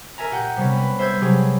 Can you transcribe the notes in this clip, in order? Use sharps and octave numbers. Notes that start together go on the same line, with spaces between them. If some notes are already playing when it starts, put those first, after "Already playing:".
A#4 E5 G#5 A#5
A#2 G4 F#5 G5 G6
C3 G3 B3 C#4
B4
C5 E5 E6 G6 G#6
C3 F#3 B3 G4 G#4